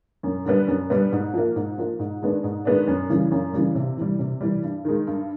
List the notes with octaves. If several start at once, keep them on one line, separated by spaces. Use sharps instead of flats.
F#2
D3 G3 B3
F#2
D3 G3 B3
G#2
F3 A#3
G#2
F3 A#3
G#2
D#3 G#3 B3 D4
G#2
D#3 G#3 B3 D4
F#2
C#3 E3 G3
F#2
C#3 E3 G3
C3
E3 G3
C3
E3 G3
G2
D#3 G#3
G2